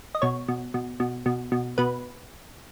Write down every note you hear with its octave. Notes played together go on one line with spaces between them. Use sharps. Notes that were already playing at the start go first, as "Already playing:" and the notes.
D#5
B2 C#5
B2
B2
B2
B2
B2
B2 B4